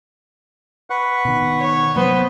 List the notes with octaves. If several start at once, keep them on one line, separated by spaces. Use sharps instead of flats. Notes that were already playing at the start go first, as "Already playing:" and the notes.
B4 F#5 C#6
B2 D#3
C#5
C3 F#3 A#3 B3 B4 C5